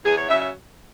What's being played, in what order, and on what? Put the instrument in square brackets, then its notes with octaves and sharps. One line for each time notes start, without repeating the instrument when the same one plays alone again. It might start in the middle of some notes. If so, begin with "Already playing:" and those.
[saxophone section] E2 G#4
C#5
C#3 F#3 E5
E5